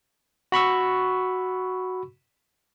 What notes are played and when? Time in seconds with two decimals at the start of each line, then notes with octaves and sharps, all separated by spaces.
0.52 F#4 B5 C#6 E6